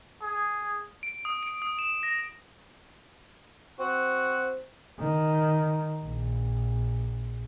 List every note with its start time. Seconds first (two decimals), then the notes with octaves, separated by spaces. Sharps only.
0.22 G#4
1.03 D7
1.25 D#6
1.43 D7
1.62 D#6
1.79 E7
2.03 A#6
3.79 C4 F#4
4.99 D#3
6.04 A#1